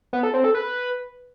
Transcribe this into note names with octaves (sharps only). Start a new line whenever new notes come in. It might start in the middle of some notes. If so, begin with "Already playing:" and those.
B3
A4
C4
A4
B4